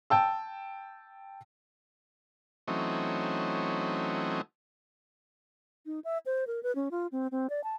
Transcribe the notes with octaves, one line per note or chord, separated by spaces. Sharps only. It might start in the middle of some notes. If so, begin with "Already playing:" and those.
G5 A5 E6
E3 F#3 A3 C4 C#4 D#4
D#4
E5
C5
A#4
B4
C#4
F4
C4
C4
D5
A5